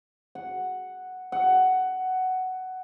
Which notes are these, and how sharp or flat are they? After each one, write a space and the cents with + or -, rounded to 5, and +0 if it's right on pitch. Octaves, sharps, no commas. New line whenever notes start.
F#5 +0
F#5 +10